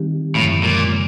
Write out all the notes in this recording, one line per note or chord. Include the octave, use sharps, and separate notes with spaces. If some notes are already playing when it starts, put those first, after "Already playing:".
Already playing: D#3 G3 C4 D#4 G4
F#2 A2 D3 F3 G#3
A#2
C#3